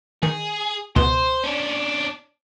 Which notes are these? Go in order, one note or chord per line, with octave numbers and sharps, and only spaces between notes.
D#3 G#4
C#2 B2 C5
C#4 D4